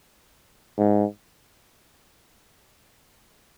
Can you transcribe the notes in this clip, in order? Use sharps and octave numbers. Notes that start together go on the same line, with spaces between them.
G#2